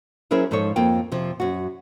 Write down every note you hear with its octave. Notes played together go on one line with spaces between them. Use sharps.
F#3 C#4 E4 G#4 A#4 C5
G#2 F3 D#4 A4 C#5
F2 A#3 F4 G5
F2 C3 F3
F#2 F#4